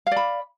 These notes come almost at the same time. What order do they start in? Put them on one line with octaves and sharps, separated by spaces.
F5 D5 B5